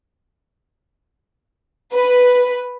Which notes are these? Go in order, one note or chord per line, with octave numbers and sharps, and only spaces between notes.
B4